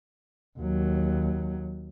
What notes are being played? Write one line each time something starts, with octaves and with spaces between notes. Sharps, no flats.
D#2 F#3